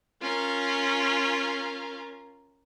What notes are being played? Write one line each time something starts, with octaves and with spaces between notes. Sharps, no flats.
C#4 F4 A#4